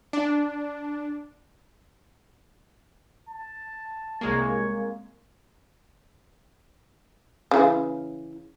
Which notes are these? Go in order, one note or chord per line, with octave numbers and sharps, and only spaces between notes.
D4
A5
C2 G#3 A#3 C#5
C#3 E3